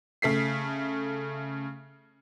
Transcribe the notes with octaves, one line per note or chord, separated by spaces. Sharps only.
C#3 A3 B6 C7